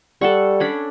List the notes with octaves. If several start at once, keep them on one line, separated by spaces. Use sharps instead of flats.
G3 A4 F#5 C#6
C#4 D4 B5